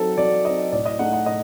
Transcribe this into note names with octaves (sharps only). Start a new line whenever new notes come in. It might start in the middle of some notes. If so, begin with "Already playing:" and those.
Already playing: F#3 C4 D#4 A4
F#3 D5
C4 D#4 D#5
A2 D5
D#5
A3 D#4 F#5
F#5
A2 D#5